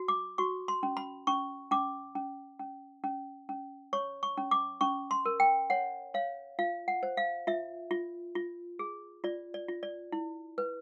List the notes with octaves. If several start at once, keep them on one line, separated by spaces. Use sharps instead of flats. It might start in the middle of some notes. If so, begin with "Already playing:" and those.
Already playing: F#4
D6
F#4 C#6
C6
C#4
B5
C#4 C#6
C#4 D6
C#4
C#4
C#4
C#4
C#5 C#6
C#6
C#4
D6
C#4 C#6
C6
A#4
G5
C#5 F#5
C#5 F5
F4 F5
F#5
C5
F5
F4 E5
F4
F4
G#4
F4 D5
D5
F4
D5
E4
B4